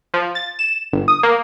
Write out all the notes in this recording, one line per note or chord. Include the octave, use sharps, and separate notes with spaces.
F3
A6
E7
G1
D#6
A#3